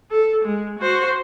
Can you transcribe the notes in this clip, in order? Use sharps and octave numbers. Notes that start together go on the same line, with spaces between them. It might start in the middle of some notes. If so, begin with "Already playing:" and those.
A4
G#3
F#4 C5